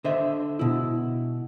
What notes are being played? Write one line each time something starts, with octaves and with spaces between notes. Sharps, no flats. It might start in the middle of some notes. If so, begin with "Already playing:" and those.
D3 C5 D#5 E5
B2 E4